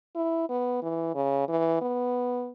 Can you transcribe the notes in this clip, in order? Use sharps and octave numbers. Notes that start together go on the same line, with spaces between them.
E4
B3
E3
C#3
E3
B3